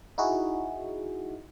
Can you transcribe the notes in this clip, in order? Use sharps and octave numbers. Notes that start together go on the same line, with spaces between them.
D#4 E4 F#4 G#4